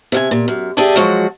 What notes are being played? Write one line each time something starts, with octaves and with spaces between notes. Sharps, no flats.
C3 F5 G#5
A#2
F#2
G4 G#4 D5 E5 G#5 A5
F3 F#3 G#3 F#4